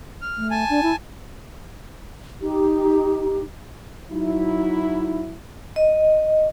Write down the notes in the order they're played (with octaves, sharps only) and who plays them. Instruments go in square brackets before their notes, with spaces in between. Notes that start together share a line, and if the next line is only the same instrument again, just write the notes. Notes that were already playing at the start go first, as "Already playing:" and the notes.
[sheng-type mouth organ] F6
[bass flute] A3
[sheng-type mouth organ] G#5 A5
[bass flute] D4
E4
[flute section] D#4 G4
[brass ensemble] F#3 E4 [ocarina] D#4
[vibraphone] D#5